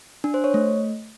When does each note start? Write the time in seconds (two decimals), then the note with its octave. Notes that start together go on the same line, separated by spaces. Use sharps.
0.24 D4
0.34 C5
0.44 C#5
0.54 A3